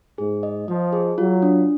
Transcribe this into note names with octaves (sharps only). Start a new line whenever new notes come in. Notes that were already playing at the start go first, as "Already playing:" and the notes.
G#2 G#4
D#5
F3 D#5
G#4
F#3 F4
D4